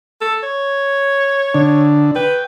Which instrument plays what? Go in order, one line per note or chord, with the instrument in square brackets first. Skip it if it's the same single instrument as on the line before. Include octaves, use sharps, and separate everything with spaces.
[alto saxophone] A4
C#5
[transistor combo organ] D3 D4
[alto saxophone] B4 [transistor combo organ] G5